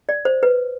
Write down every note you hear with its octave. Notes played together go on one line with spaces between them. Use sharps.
D5
C5
B4